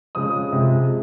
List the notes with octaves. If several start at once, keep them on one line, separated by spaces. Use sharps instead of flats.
F2 C#3 G#3 D#6
C3 F3 G#3